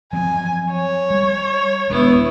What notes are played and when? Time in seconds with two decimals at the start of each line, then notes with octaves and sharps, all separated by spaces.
0.13 F3 F#3 C4 G#5
0.72 C#5
1.10 G3
1.90 D#1 G#3 B3 D4 E4